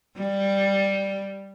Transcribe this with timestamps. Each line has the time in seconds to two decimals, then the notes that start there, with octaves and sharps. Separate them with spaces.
0.18 G3